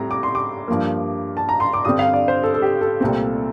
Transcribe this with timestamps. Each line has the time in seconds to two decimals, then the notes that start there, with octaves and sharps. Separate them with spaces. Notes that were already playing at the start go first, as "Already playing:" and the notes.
Already playing: A2 G3 C4 A#5
0.11 D6
0.23 C6
0.35 D6
0.68 G2 F3 A#3
1.37 A5
1.49 A#5
1.60 C6
1.73 D6
1.85 G2 D3 G3 C4 D#6
1.99 F5
2.13 D5
2.28 C5
2.43 A4
2.54 A4
2.62 G4
2.81 A4
3.01 C2 A#2 A3 C4